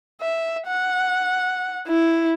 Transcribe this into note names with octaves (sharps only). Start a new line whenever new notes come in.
E5
F#5
E4